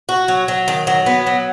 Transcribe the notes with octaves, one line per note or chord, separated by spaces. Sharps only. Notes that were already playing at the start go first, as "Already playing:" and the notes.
F#4
F#3
F#3
D#3
F#3
B3
F#3